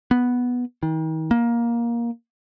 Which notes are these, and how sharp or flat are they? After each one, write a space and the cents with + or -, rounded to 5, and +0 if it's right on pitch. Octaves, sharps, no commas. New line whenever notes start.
B3 -5
D#3 +40
A#3 +15